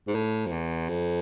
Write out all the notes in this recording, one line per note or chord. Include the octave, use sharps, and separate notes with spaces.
G#2
A2
F2
E2
F2